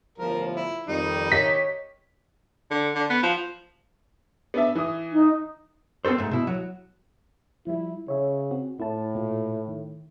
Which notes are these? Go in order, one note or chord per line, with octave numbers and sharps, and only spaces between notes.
G1 A2 F3 A#4
E4
F2 D#3 G3 D#4
G4 C#5 D#5 B6
D3
D3
B3
F3
B3 D4 E5
E3 D#6
D#4
B3 C4 F4 A4 C5
G#2 A3
B2 E4
F#3
F3 G3 E4
C#3 C#5 E5
C4 F#4
A2 E4 A5
A#2 F4 A4
D#3